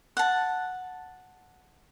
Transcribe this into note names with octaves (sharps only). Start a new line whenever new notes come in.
F#5 A5